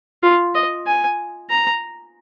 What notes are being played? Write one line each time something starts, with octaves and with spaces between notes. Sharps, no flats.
F4
D#5
G#5
A#5